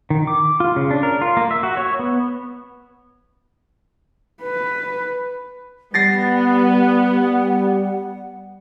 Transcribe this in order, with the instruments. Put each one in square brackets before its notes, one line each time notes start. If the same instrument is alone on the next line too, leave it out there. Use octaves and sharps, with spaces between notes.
[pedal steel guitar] D#3
D6
F4
C#3
D4
A#4
F4
A#3
E5
F#4
C#5
B3
[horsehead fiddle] B4
[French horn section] G3 [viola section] B3 [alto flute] F#5 [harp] A6 A#6 C7